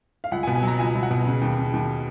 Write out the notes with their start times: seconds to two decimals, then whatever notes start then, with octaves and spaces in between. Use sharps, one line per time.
0.24 F5
0.32 C#2 F#5
0.43 G#5
0.47 B2
0.55 G#5
0.63 F#3 A#5
0.79 C#2 G#5
0.95 C#2
1.03 F#5
1.11 B2
1.26 C#3
1.42 D#2
1.57 C#3
1.74 D#2